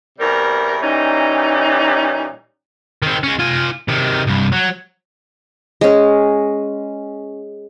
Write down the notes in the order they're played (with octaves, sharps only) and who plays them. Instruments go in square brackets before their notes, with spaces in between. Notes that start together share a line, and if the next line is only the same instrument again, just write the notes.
[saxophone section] E2 C3 G3 A#4
A#2 E3 G3 C#4 D#4
[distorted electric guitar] D#3 C4
G#3 C#4
F4 G#5
C3 D#3
C2 G2
F#3
[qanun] G#3 C#4